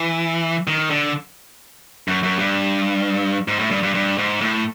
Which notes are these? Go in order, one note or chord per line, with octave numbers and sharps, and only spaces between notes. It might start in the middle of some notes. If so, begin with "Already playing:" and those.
Already playing: E3
D#3
D3
F#2
F#2
G2
G#2
A2
G2
G2
G2
G#2
A2